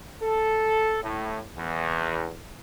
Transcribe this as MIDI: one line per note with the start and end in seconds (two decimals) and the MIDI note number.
0.22 0.99 69
1.03 1.41 45
1.57 2.32 40